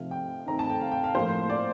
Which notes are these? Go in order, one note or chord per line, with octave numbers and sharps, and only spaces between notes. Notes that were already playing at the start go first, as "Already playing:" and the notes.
Already playing: C3 F3 A3 C4 D#4 F5
G5
D#3 A3 C4 A#5
A5
G5
F5
G5
F5
A2 F3 A#3 F4 C5
D5